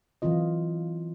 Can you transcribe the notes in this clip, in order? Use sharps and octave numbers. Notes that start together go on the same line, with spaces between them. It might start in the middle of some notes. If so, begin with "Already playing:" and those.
E3 F#3 C4 F4 D#5